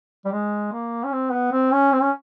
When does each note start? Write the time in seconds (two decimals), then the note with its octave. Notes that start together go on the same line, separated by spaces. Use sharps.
0.25 G3
0.32 G#3
0.72 A#3
1.04 C#4
1.12 C4
1.32 B3
1.52 C4
1.72 C#4
1.92 C4
2.01 C#4